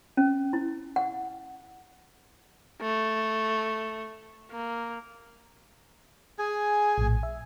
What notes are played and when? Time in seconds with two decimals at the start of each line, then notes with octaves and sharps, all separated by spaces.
0.17 C#4
0.53 E4
0.96 F#5
2.81 A3
4.51 A#3
6.39 G#4 G#5
6.98 A#1 A2
7.23 E5